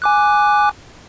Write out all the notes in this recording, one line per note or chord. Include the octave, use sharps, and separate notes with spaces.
G#5 D6 F#6